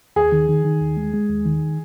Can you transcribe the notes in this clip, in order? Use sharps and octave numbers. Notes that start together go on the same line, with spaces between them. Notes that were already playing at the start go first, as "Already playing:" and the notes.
D#2 G#4
D#3
D#3
D#3
D#2
G#3
G#3
D#2
D#3